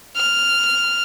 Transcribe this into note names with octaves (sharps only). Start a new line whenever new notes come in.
F6